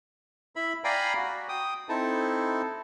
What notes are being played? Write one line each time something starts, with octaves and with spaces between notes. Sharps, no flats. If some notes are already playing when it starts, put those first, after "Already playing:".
E4 E5 B5
D5 F5 G5 G#5 A#5 B5
F#4
G5 D#6
C4 D#4 E4 A4 A5